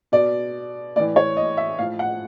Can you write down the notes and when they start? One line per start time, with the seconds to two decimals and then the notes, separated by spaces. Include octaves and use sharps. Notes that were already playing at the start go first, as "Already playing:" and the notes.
0.12 B2 D5
0.96 A2 E3 D5
1.16 C#5
1.37 D#5
1.57 E5
1.78 A2 F5
1.82 F3
1.99 F#5